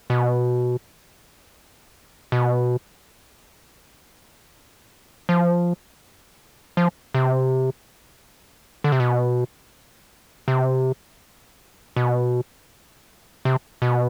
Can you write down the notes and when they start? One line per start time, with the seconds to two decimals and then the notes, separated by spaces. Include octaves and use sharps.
0.10 B2
2.32 B2
5.29 F3
6.77 F3
7.14 C3
8.84 D3
8.92 C3
9.00 B2
10.48 C3
11.96 B2
13.45 C3
13.82 B2